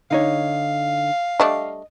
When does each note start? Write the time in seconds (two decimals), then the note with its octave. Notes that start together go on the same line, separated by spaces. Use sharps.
0.11 D3 D#4 C#5 F5
1.40 G3 A3 D4 D#5